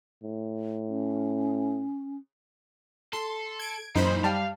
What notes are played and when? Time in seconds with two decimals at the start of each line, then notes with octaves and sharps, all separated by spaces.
0.23 A2
0.89 C#4
3.13 A4 C6
3.59 G#6 D7
3.95 F#2 A#2 E3 D#4 C5 B5
4.24 G3 F5 G5 A5